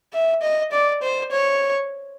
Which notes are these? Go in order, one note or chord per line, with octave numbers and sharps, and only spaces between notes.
E5
D#5
D5
C5
C#5